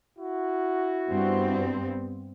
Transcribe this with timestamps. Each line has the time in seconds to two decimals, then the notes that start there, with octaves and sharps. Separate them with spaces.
0.19 E4 F#4
1.09 G2 B3 C4